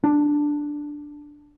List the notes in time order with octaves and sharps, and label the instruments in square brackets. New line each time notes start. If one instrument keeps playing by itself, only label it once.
[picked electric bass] D4